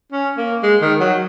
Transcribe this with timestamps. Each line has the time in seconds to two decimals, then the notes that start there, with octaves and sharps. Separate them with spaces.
0.12 C#4
0.37 A#3
0.63 G#3
0.81 D#3
1.00 F#3